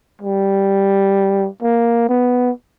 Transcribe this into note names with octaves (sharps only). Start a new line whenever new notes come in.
G3
A#3
B3